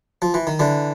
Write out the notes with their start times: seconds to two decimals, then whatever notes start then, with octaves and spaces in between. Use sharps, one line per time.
0.22 F3
0.34 E3
0.47 D#3
0.59 D3 E3